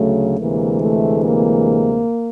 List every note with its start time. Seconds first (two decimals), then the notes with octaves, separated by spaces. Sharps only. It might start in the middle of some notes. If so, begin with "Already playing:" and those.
Already playing: D2 C#3 F#3 A3
0.39 D2 C3 E3 G#3 A#3
0.81 A3
1.23 A#3